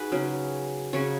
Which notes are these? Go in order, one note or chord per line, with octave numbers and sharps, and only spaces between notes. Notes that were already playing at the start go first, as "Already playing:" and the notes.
Already playing: D#4 F#4 G#4 B4
C#3 F#3 C#4
C#3 F#3 C#4 C#5